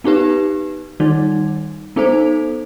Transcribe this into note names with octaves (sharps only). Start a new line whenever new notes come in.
B3 D#4 G4 B4
D#3 G3 D#4
B3 D#4 A4 C5